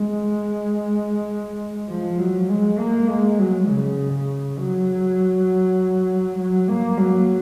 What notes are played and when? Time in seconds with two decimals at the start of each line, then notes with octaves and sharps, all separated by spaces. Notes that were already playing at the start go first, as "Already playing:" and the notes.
Already playing: G#3
1.89 F3
2.18 F#3
2.49 G#3
2.78 A#3
3.09 G#3
3.39 F#3
3.67 C#3
4.12 C#3
4.58 F#3
6.37 F#3
6.68 A#3
6.98 F#3